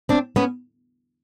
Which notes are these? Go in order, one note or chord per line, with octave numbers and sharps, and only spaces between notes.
C4 D4
B3 C#4